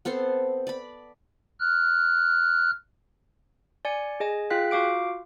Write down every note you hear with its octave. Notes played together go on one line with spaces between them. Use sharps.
B3 C4 A4 C5
D5 B5
F6 F#6
D5 G#5 C#7
G#4 D#5 G#5
F4 G#4 F5 G5 F#6 B6
F4 F#4 F5 D6 D7